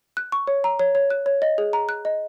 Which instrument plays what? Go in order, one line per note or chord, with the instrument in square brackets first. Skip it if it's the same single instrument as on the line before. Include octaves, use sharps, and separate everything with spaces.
[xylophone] F#6
C#6
C#5
A#5
C#5
C#5
F#6
C#5
D#5
G#4
A#5
F#6
D#5